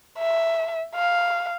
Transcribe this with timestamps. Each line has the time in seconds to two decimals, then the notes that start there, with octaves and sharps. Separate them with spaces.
0.18 E5
0.95 F5